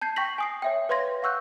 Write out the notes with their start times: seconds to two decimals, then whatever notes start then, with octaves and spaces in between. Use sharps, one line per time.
0.01 A5 G6 G#6 C7
0.16 G5 C#6 G6 A#6 B6 F#7
0.38 G#5 D#6 C7
0.62 C#5 E5 G5
0.89 B4 C#5 F5 C6 G#6 A#6
1.22 F5 F#5 C#6 E6 F#6 G6